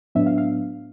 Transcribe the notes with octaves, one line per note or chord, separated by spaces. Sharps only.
A2 F#3 B3 D4 E5
F5
F5